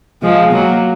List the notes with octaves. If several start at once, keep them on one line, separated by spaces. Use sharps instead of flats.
F3 G#3
F#3 A#3